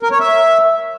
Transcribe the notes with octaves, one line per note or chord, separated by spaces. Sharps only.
A#4
C#5
E5